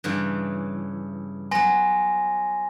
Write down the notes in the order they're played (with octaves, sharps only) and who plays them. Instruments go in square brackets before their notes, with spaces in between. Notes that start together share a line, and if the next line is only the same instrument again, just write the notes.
[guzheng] G2 C#3 E3
[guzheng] F#3 B3 [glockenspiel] G#5 C6 A#6